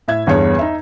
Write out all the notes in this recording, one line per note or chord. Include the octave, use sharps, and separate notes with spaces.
A2 E5 G#6
G1 E2 G2 G#4 C#5
D#4 E5